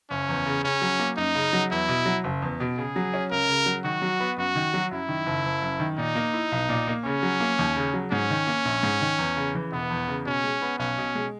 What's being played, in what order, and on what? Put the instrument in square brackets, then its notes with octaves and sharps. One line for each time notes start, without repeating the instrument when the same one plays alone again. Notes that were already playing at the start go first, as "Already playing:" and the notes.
[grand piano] F#1 [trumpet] C#4
[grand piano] E2
C#3
[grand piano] C#3 [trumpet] C#4
[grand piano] F#3
A#3
[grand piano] F#2 [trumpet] D#4
[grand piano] C#3
F#3
[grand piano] E2 [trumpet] E4
[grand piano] B2
F#3
F#1
E2
B2
[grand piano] C#3 [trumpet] G#4
[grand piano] F#3
C#4
[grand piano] C#2 [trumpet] A#4
[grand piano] C#3
F#3
[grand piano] D#3 [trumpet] F#4
[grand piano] F#3
B3
[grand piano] F#2 [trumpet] F#4
[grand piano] D#3
F#3
[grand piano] F#2 [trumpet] E4
[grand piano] D#3
F#1
F#1
F#2
D#3
[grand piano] A#2 [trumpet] D#4
[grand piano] A#3
E4
B1
A#2
A#3
[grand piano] C#3 [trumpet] C#4
[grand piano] F#3
A#3
D#2
C#3
F#3
[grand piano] G#2 [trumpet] C#4
[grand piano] D#3
A#3
A#1
G#2
D#3
E2
C#3
E3
[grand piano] E1 [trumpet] B3
[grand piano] E2
C#3
[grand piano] B2 [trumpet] C#4
[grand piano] G#3
B3
[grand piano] B1 [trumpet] C#4
[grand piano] B2
G#3